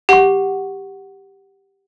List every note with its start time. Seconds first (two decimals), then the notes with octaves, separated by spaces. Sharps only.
0.09 G4 F#5 C#6